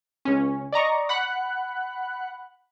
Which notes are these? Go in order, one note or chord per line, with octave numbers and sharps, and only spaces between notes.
C#2 C#4
D5 D#5 A#5 C#6
F#5 B5 F#6